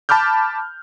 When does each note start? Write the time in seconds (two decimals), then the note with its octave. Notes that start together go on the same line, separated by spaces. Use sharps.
0.09 A5 B5 D6 F6 G6